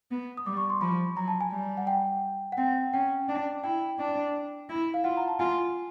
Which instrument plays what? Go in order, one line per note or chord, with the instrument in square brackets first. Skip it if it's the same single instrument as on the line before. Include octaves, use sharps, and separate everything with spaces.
[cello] B3
[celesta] D#6
[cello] G3 [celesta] D6
[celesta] C#6
C6
[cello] F3 [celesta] B5
[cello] F#3 [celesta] A#5
[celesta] A5
G#5
[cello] G3
[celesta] F#5
G5
F#5
[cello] C4 [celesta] G5
[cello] C#4 [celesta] G5
[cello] D4
[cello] E4 [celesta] G5
[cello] D4
E4
[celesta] F5
[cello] F4 [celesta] F#5
[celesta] A#5
A5
[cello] F4 [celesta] G#5